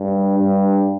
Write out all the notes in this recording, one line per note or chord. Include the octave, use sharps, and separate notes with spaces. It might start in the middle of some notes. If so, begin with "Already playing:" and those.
Already playing: G2
G2